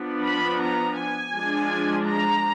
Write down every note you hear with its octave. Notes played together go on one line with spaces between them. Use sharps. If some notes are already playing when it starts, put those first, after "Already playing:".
Already playing: F3 B3 D4
B5
A#5
G#5
F3 G#3 D4
A#5